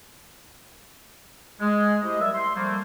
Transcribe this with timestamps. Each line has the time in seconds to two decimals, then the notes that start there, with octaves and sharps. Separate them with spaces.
1.61 G#3
2.02 A3 E4 G4 C5 D#5
2.20 F#3 G3 A#4 D5 E5
2.35 C6
2.55 F3 G3 A3 A#3